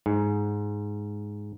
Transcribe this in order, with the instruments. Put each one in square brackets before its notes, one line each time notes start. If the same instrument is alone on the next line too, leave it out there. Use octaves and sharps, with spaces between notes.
[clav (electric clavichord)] G#2